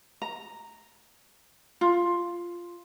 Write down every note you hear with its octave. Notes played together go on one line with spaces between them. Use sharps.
A#5
F4